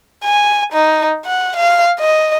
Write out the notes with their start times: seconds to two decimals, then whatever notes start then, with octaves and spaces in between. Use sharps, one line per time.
0.24 G#5
0.72 D#4
1.26 F#5
1.56 F5
2.00 D#5